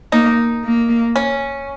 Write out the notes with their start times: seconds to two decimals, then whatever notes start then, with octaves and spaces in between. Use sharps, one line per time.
0.12 A#3 D#4
0.64 A#3
1.16 C#4